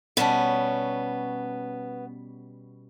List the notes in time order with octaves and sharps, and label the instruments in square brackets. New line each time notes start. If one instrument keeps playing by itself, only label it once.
[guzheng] B2 G3 C#4 [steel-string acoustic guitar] B3 [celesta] F#5 A5